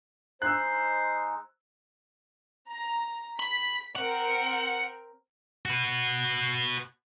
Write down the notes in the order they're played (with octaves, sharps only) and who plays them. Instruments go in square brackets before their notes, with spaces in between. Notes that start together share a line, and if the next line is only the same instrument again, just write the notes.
[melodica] G#3 D#4 [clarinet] C5 [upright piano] E6 F#6
[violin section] A#5
[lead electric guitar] B5 [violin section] B6
[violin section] C4 A#4 D7 [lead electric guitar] F#5
[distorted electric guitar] F#4 B4